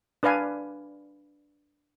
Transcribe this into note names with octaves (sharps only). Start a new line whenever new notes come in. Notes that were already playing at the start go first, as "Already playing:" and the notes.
D4 B4 D5 F5 G#5